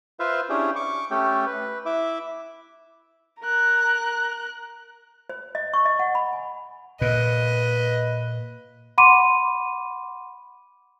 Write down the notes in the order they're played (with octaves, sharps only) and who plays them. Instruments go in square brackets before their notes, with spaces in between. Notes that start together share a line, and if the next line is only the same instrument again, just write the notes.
[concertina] F4 B4 C5 E5 F5
C#4 D4 E4 G4 G#4 G5
C#6 D6
A3 C#4 G4 A4 G5
B4
E4 E5 D6
[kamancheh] A#4 F#6
[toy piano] C5
D#5
C#6
D#5
F#5
B5
G#5
[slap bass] A#2 [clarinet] B4 [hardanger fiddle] D#5
[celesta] F#5 B5 C6 D6 D#7